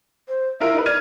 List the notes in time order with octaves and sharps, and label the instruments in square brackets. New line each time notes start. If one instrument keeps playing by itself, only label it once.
[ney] C5
[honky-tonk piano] E4 F4 A#4 [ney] E5
[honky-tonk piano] D#4 B4
[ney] D5 [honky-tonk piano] F6 G#6 D#7